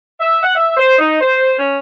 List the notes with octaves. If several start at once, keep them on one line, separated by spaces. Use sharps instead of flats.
E5
F#5
E5
C5
D#4
C5
C#4